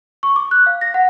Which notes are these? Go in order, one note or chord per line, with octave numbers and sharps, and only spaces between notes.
C#6
D6
F#6
F5
A#6
F#5